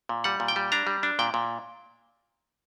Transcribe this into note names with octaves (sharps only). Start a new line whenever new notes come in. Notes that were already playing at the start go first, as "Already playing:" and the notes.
A#2
G3 F#5
A#2
G5
G3
D4 A#5
G3
D4
A#2 G5
A#2